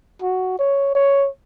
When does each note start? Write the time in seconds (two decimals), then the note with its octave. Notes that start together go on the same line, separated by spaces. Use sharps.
0.22 F#4
0.59 C#5
0.95 C#5